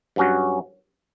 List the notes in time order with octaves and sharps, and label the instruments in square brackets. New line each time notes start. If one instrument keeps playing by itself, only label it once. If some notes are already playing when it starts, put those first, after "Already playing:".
[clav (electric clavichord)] G2 F#3 C#4 F#4